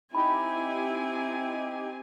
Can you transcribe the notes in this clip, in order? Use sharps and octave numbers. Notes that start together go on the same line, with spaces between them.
C4 D#4 E4 G4 G#5 B5